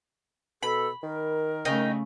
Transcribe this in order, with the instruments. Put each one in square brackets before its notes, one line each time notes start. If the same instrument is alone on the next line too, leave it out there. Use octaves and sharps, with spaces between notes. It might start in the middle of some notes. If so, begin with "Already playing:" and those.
[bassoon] B2 [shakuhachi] A4 [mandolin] B5
[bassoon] D#3 [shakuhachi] A#4
[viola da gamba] C#3 A3 [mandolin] D#4 G5